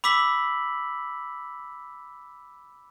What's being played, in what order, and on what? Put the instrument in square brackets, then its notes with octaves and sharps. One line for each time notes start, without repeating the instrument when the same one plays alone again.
[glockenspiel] B5 D6 E6 B6 F#7